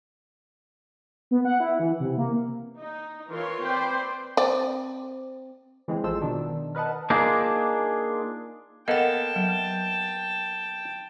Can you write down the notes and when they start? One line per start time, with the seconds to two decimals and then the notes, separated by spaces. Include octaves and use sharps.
1.31 B3
1.45 F#5
1.60 E4
1.80 E3
2.00 C3
2.18 A#3
2.77 D#4
3.30 E3 F4 A#4 C#5 C6
3.63 C4 B4 C5 D5 G5 C6
4.37 C4 D5
5.88 E3 G#3 C4
6.04 A1 F3 G#3 A4 C5 E6
6.21 B2 D#3 D4
6.75 A#4 B4 D#5 F#5 A5
7.10 A#3 D4 D#4 F4 G#4
8.88 A#3 B3 A4 D#5 F#5 G5 A5
9.36 F#3